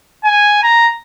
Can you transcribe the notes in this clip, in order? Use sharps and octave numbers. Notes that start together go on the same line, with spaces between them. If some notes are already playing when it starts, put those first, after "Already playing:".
G#5
A#5